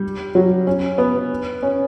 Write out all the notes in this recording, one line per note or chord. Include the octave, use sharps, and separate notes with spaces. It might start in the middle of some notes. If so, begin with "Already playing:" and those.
Already playing: G3
F#3
C#4
B3
C#4